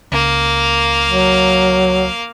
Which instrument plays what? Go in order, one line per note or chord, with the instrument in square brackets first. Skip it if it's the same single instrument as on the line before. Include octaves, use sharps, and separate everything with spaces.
[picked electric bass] C#2 [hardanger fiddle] A#3 F5
[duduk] F#3